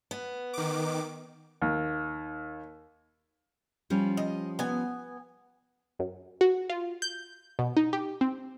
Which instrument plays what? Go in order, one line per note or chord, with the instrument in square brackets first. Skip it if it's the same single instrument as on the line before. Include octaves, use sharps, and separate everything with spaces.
[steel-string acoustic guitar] B3
[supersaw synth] D#3 D6
[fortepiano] D#2
[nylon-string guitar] F3 G3 C#4
[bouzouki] D#5
B3 G#5
[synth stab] F#2
F#4
F4
G6
B2
D#4
G4
C4